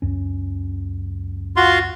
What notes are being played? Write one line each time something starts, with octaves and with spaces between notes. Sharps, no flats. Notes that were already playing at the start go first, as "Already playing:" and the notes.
C#2 F#2 C#4
F4 F#4 C6